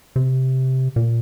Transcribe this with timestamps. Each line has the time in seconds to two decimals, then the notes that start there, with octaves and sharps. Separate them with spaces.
0.16 C3
0.96 A#2